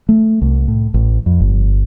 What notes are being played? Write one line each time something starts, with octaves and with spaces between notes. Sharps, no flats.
A3
C2
A2
A1
F2
G1